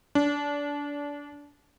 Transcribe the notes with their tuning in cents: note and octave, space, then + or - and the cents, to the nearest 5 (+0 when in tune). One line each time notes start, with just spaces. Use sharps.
D4 -25